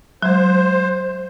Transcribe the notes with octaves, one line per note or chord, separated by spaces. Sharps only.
F#3 G#3 C5